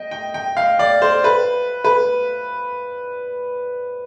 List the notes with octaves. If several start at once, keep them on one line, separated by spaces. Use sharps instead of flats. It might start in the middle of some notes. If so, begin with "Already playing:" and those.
Already playing: D#5 G5
G5
G5
F5
D5
C5
B4
B4